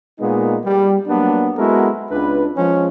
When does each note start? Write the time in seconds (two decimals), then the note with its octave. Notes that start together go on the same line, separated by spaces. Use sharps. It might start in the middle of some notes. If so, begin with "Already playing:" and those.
0.20 A#2 G#3 A#3 B3 D#4
0.65 G3
1.07 F#3 A#3 B3 D4
1.56 G#3 B3 E4 F#4 A4 A#4
2.10 C#2 D4 B4
2.56 F3 G#3 C#4